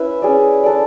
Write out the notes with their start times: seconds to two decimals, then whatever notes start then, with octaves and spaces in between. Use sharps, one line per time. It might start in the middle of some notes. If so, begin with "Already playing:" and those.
Already playing: C#4 E4 B4 E5
0.22 C#4 G#4 D5
0.63 D4 A4 D5